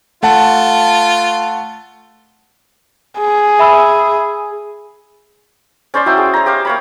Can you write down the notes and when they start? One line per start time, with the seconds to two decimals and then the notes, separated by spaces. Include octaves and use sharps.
0.23 A3 F4 F#5 A5
3.19 G#4
3.59 E5 B5 E6
5.94 C#4 C5 D5 C6
6.06 F#3 E4 G5 D#6
6.18 G#4
6.34 C#5 A#5
6.46 G4 C5 F5
6.65 A#3 C#5 B5